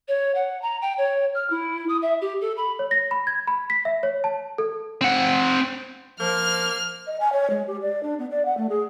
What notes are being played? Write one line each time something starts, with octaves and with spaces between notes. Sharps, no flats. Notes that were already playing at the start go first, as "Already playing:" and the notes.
C#5
F#5
A#5
G5
C#5
F6
E4
D#6
E5
G4
A4
B5
C#5
A#6
B5
G#6
B5
B6
E5
C#5
A5
A4
C4 F#5
F3 A#3 F6
D#5
G#5
C#5
G#3
G4
D5
D4
B3
D5
F#5
A3
G#4